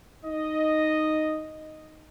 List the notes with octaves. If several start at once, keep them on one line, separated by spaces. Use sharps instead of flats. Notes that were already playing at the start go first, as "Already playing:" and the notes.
D#4 D#5